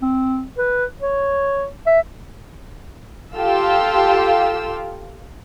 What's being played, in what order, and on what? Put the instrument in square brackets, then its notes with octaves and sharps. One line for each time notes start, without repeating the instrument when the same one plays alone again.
[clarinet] C4
B4
C#5
E5
[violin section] F4 G4 A4 F5 E6